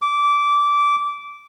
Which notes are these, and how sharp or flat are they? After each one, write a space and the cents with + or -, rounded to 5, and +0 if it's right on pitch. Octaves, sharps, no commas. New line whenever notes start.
D6 -15